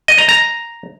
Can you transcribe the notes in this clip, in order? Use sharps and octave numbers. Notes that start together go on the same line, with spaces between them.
D#5
A#5
A#5